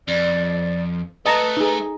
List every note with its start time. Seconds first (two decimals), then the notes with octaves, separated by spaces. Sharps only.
0.08 F2 D5
1.26 A3 B4 D#5 A5 A#5
1.57 D#4 G#4